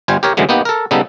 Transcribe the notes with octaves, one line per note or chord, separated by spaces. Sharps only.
G1 G3 F4 C5 G#5
G4 A#4 C#5
F#2 A2 D3 E3 F#3 G#3
A#3 B3 D#4 G4
A4 A#4
C#3 G3 B3 D#4 A4